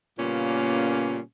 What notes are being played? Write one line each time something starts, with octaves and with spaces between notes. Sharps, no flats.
A#2 C#3 G3 A#3 B3 C#4